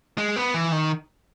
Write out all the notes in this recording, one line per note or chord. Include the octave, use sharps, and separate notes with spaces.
G#3
B3
E3
D#3